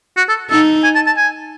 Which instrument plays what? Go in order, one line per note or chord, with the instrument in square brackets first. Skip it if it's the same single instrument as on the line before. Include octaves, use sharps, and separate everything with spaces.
[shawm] F#4
A4
[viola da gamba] D#4 [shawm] A4
[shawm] G#5
A5
A5
G#5